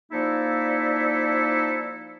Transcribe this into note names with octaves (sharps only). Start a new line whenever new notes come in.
F3 A#3 D#4 E4 A4 D5